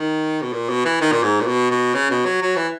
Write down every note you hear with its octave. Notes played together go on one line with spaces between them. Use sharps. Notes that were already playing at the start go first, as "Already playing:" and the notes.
Already playing: D#3
B2
A#2
B2
E3
D#3
A#2
G#2
A#2
B2
B2
C#3
B2
F#3
F#3
E3